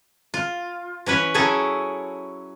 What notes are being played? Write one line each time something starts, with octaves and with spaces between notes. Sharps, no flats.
F4
E3 C#4 B4 C#5
F#3 C#4 E4 G#4 A4